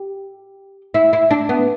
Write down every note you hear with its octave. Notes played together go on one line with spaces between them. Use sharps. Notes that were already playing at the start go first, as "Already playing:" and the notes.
Already playing: G4
E4
E4
D4
B3